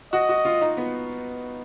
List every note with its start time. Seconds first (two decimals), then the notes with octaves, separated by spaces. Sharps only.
0.13 F#4 D#5
0.29 F#4
0.45 F4
0.62 D#4
0.77 B3